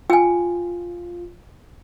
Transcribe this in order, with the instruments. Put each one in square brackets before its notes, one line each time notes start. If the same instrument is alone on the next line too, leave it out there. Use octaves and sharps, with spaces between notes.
[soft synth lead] F4 [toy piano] G5 G#5